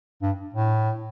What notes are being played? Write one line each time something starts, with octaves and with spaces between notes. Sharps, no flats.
G2
A2